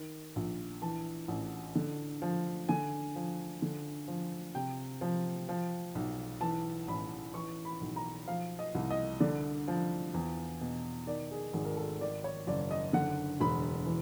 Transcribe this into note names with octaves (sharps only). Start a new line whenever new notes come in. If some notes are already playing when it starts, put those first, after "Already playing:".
Already playing: D#3
A#1
E3 A5
A1
D3
F3
D3 G#5
F3
D3
F3
C3 G5
F3
F3
B1
E3 A5
A1 B5
E3 C#6
B5
B1
A#5
F3 F5
D#5
C2
D#5
D3 D5
F3
E2
B2
D#3 D5
G#4
G#1 G#4
A#4
A4
D#3 D5
C#5
F#1 D5
D#5
D3 F#5
E1 B5
E3